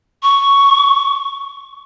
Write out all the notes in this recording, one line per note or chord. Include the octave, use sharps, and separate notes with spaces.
C#6